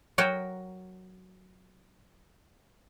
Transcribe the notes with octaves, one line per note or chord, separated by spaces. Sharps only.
F#3 F#4 A#4 G5